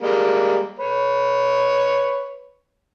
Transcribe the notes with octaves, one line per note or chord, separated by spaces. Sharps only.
G3 G#3 A#3
B4 C#5